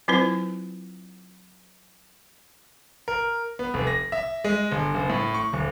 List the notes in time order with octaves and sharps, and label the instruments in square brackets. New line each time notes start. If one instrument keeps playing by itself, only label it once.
[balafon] F#3 C4 E4 F4 B4 C5
[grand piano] A#4
B3
F1
A#6
E5
G#3
G1
F#1
A2
C#6
D1